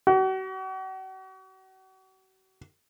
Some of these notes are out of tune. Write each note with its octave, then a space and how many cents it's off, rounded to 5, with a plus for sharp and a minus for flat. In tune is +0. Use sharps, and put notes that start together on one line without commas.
F#4 +40